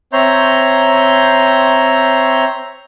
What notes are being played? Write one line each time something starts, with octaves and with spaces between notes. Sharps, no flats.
C4 C#5 E5 A#5 C6 G6